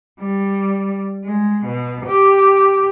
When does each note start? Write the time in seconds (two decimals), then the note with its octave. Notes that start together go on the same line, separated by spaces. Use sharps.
0.20 G3
1.24 G#3
1.66 B2
2.06 G4